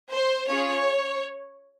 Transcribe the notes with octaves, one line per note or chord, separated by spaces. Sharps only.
C5
C#4 F4 G#4 C#5